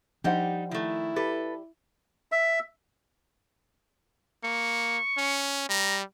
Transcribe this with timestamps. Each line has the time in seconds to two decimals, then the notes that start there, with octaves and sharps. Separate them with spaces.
0.24 F3 G3 D4 D#4 G4 C5 F#5
0.71 D#3 A3 E4
1.16 G4 A4 B4 D5
2.32 E5
4.44 A#3 C#6
5.18 C#4
5.69 G3 A#5